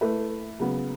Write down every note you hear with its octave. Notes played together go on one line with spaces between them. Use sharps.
A3 E4 B4
C#3 F#3 B3